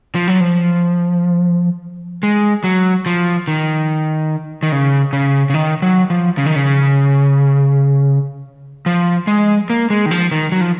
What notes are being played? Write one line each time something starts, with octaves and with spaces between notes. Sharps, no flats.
F3
F#3
F3
G#3
F#3
F3
D#3
D#3
C#3
C#3
C#3
D#3
F#3
F3
C#3
D#3
C#3
F3
G#3
A#3
G#3
D#3
F3
D#3
F#3
F3